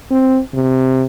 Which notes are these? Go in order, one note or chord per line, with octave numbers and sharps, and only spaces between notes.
C4
C3